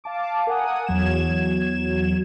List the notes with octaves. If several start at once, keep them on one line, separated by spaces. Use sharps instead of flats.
F5 A5 D6
A#4 F#5 G#5 D#6
E2 F#3 G#6 E7